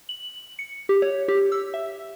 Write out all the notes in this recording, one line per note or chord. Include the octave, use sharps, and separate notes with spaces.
F#7
C#7
G4
C#5
G4
E6
E5